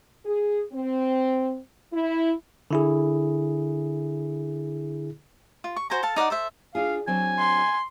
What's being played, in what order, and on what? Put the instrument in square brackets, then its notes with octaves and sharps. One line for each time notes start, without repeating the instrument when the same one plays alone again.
[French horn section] G#4
C4
E4
[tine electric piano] D3 E4 G#4
[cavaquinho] F4
C#6
F#4 C5 G#5 A#5
A4 F5 A5
D#4 D5 E5 F#5
A4 C5 E5
[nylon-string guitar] D4 F4 G#4 [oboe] F5
[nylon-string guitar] F#3 C4 D4 [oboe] G#5
[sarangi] C6